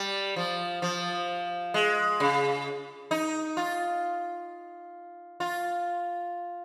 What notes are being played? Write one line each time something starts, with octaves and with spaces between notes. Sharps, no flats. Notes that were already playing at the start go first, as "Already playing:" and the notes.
Already playing: G3
F3
F3
G#3
C#3
D#4
F4
F4